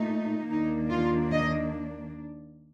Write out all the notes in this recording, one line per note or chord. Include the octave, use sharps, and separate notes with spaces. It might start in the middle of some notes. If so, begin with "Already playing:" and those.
Already playing: A#2 A3 D#4
D#2 D#3 A#3 D4 D#4
F4
D#5